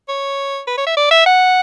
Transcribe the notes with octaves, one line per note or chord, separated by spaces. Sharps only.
C#5
B4
C#5
E5
D5
E5
F#5